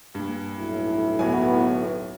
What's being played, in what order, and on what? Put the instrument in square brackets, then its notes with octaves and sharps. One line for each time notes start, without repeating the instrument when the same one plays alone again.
[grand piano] G2 A#2
[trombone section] B1 A2 [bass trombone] E4
[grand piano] D1 F#3 G#5 [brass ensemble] B3